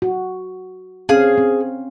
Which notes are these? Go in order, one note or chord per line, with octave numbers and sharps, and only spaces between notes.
F#4
C4 C#4 G#4 F5
C4